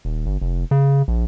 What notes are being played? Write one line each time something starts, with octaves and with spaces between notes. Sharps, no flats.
D#1
G1
F1
C#3
A#1